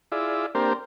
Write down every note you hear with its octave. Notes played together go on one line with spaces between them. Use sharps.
E4 F4 G#4 D5 E5
A#3 C4 D4 G4 A#4 C5